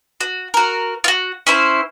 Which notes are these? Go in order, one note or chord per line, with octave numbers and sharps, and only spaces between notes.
F#4
F#4 A#4
F4 F#4
C#4 E4 C5